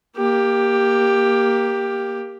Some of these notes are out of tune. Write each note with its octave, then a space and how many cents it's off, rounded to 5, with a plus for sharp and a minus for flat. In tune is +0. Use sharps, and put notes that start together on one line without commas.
A#3 +5 G4 +10